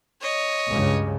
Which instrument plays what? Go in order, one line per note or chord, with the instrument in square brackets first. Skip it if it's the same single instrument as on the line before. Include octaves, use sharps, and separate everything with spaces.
[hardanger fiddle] C#5 D#5
[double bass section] C#2 G2 C#3